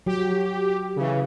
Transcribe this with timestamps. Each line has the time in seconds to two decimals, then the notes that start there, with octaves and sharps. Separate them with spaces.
0.06 F#3 G4
0.96 C#3 E3